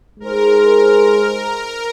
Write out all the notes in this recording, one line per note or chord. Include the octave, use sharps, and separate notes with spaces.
G#3 D#4 G#4 A#4 C5